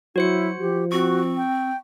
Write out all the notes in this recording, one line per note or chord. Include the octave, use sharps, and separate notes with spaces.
F#3 E4 F#4 C5 C#7
F3 G4
C4 F#4 C#6
G5